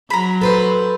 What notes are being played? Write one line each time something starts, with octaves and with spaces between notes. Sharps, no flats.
F#3 A#5 B5
A4 B4 C5